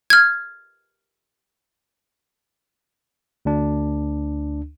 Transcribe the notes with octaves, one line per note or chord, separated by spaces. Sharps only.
F6 G#6
D2 D4